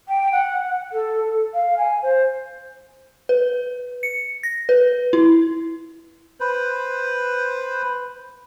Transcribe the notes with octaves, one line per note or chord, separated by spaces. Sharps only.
G5
F#5
A4
F5
G#5
C5
B4
C#7
A#6
B4
E4
B4 C5